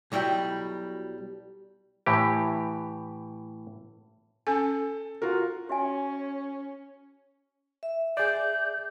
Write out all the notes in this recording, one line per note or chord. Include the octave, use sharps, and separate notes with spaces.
B1 F#3 G3 E4 G5
A2 E3 G4
C#4 A4 G#5
F4 F#4 A#4
C#4 F#4 C#5 E5 G#5
E5
G#4 D5 G6